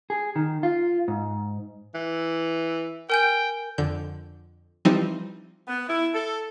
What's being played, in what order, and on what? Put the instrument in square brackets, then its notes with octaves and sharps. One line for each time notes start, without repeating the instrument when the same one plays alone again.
[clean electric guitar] G#4
D#3
F4
G#2
[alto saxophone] E3
[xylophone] A#4 G#5 G6 [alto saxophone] G5
[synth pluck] F2 D3 G6
E3 F3 G3 C4 D#4
[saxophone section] B3
E4
A4